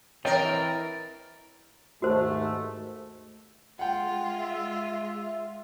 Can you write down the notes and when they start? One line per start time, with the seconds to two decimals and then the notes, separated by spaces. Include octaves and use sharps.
0.25 E3 C4 A#4 C#5 D#5 G5 A6
2.02 D#2 G#2 A3 F#4 C5
3.79 G#3 F4 F#5 G5
4.37 E5